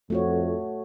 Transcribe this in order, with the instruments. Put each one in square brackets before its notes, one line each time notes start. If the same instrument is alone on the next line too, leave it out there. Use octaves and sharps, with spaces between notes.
[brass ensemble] F2 [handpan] A3 F#4 C#5